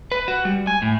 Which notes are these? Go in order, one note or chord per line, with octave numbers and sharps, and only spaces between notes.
B4
F#4
G3
G#5
A2